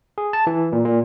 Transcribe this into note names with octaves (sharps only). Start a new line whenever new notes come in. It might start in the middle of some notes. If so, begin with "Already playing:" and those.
G#4
A5
E3
A#2
A#2